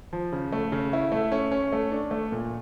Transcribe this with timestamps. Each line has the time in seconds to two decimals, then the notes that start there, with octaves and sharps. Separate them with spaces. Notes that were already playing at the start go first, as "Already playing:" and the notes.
0.13 F3
0.32 C#3
0.53 A3
0.72 C#3
0.93 E4
1.12 A3
1.32 C#4
1.51 C#4
1.72 A3
1.92 D4
2.11 A3
2.32 A#2